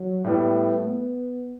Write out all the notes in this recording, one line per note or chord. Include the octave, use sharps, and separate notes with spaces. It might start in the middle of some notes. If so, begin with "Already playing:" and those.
Already playing: F#3
A2 G3 A3 B3
B3